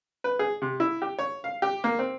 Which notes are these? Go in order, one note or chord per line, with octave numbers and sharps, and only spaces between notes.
B4
G#4
C3
E4
G4
C#5
F5
G4
A#3
C4